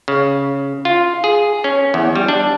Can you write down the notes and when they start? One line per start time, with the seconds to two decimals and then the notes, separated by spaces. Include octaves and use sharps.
0.08 C#3
0.85 F4
1.24 G#4
1.64 C#4
1.94 E2
2.16 G3
2.28 D4